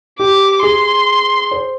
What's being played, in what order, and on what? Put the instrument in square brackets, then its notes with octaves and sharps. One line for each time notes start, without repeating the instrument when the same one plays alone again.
[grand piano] G4 [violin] D6
[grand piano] G#4 [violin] C6
[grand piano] C5